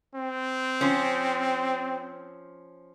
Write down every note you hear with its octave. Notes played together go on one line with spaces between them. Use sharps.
C4
F3 C#4